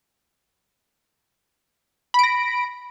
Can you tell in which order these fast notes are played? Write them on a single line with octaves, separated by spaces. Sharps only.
B5 D7 A#6